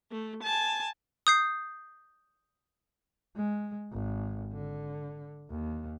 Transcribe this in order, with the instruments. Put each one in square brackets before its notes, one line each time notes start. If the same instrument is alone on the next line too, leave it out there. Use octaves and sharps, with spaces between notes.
[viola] A3
G#5 A5
[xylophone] D#6 G6 C7
[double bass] G#3
G#1
D3
D#2